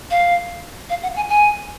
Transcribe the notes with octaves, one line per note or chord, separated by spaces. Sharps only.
F5
F5
F#5
G#5
G#5